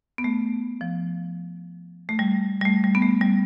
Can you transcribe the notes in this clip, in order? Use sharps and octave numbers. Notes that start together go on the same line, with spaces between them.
B3
A3
F3
A3
G3
G3
A3
G3
B3
A3
G3